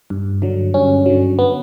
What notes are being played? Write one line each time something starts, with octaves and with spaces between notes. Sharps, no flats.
G2
D3 F#3
G2 C#4
D3 F#3
B3